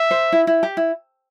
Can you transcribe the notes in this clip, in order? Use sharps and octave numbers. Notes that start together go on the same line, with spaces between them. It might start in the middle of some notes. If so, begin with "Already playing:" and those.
Already playing: E5
C5
E4
E4
G4
E4